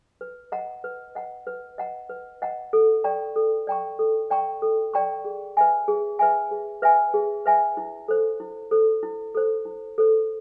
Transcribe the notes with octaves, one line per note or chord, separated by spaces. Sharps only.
B4
D#5 F#5 A#5
B4
D#5 F#5 A#5
B4
D#5 F#5 A#5
B4
D#5 F#5 A#5
A4
D5 G5 A#5 C#6
A4
D5 G5 A#5 C#6
A4
D5 G5 A#5 C#6
A4
D5 G5 A#5 C#6
G#4
B4 E5 G#5
G#4
B4 E5 G#5
G#4
B4 E5 G#5
G#4
B4 E5 G#5
E4
A4 C5
E4
A4 C5
E4
A4 C5
E4
A4 C5